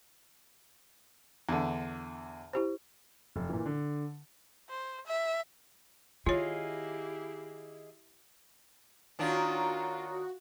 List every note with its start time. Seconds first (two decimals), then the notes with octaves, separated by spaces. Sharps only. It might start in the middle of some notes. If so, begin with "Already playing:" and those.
1.49 E2 D3
2.53 E4 G4 C5
3.36 F1
3.49 A#2 E3
3.66 D3
4.69 C5
5.06 E5
6.26 D#3 E4 F4 G4 G#4 C#5 D#5 F5
9.19 D#3 A#3 D4 F4 F#4 C#5 A#5 C#6